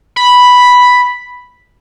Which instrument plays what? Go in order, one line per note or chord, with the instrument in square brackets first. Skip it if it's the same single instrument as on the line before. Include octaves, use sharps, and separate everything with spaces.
[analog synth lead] B5